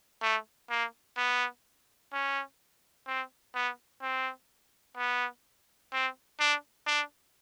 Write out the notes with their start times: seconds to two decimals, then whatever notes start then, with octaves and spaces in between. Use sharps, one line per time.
0.22 A3
0.70 A#3
1.17 B3
2.13 C#4
3.07 C4
3.55 B3
4.02 C4
4.97 B3
5.93 C4
6.40 D4
6.87 D4